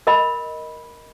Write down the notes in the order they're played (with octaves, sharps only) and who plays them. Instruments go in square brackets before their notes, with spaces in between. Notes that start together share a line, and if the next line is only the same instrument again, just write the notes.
[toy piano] A#4 D#5 B5